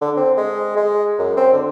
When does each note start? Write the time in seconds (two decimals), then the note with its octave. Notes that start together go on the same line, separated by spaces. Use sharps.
0.01 D3
0.17 C4
0.37 G#3
0.76 G#3
1.18 F#2
1.36 C4
1.53 D3